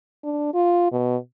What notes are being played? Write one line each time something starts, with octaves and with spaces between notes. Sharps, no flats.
D4
F4
B2